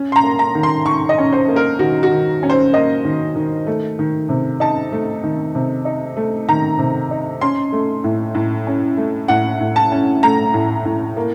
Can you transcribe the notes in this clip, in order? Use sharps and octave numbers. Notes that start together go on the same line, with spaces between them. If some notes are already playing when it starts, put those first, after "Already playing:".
Already playing: C#4
C6
A#5
A#3
A#5
D#3
C6
D#3 C#6
D#5
C#4
C5
A#3
A#4
D#3 F#4
F#4
D#3
C#4
C5
A#3 D#5
D#3
D#3
A3
D#3
C3
D#4 A5
A3
D#3
C3
D#4
A3
D#3 A#5
C3
D#4
C#4 C6
A3
A2
A2
C#4
A3
A2 F#5
A2
A5
C#4
A3 A#5
A2
A2
A#3